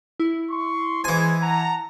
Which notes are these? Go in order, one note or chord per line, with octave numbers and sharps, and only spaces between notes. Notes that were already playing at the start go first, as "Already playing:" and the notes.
E4
C6 C#6
E3 G#3 C5 G#5
F#5 A5 A#5